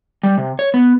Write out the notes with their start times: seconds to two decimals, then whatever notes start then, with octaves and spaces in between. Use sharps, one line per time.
0.23 G3
0.38 C3
0.59 C#5
0.74 B3